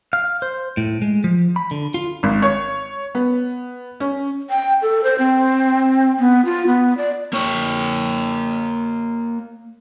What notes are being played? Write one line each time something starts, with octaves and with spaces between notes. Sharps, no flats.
F5
C5
A2
G#3
F3
B5
D3
F4
G#1
C#5
B3
C#4
G5
A4
C5
C4
B3
F4
B3
D5
A#3 C#5